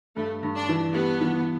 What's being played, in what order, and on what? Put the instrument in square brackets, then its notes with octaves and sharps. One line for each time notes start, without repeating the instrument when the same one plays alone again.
[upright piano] G2 [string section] A3
[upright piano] G2
[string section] D4
[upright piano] E3
[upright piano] G3 [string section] B3
[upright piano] E3